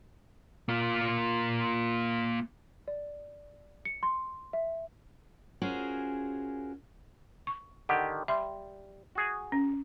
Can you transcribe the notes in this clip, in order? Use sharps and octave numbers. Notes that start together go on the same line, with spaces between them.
A#3 F4
D5
C#7
C6
E5
C#4 F4 F#4 G#4 A#4 C5
C#6
D3 D#3 G4 F#5
G3 E5 C6
F#4 G#4 G#5
C#4